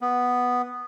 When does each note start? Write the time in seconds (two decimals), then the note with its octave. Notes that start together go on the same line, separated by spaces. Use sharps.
0.01 B3